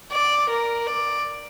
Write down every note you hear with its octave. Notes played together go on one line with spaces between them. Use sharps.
D5
A#4
D5